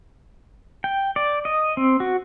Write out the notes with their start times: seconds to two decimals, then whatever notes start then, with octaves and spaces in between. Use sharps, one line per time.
0.84 G5
1.16 D5
1.45 D#5
1.77 C4
2.00 F#4